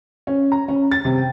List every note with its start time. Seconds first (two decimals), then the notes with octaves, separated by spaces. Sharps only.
0.27 C#4
0.52 A#5
0.68 C#4
0.91 A6
1.05 C3
1.18 G5